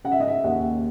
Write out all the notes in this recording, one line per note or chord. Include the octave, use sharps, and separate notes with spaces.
C#3 F#5
E5
D#5
E5
D#2 F#5